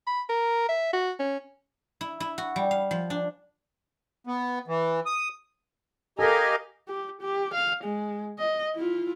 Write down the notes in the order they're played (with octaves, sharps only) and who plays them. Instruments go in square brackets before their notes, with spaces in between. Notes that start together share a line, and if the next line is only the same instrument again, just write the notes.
[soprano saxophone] B5
A#4
E5
F#4
C#4
[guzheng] E4
E4
F#4
G3
F5
F3
D4
[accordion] B3
E3
D#6
[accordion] G4 D#5 G#5 [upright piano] A4 [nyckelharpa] A#4 F5
[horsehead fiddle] G4
G4
F5
G#3
D#5
E4 F4